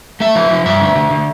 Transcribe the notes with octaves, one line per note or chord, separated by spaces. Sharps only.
A3 E5
F3
F3
G2 E5
D3
D3
D3